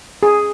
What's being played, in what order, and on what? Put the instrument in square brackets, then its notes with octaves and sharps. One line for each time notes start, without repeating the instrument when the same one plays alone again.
[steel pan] G#4